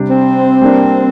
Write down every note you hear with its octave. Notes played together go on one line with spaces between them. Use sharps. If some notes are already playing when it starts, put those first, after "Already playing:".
Already playing: C3 G3 D4 G4
C4
G3 A#3 D4